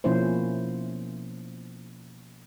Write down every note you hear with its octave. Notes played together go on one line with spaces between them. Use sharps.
B2 F3 A#3 C#4 E4 C5